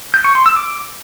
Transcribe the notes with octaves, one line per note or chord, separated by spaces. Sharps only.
G6
C#6
C6
E6
D6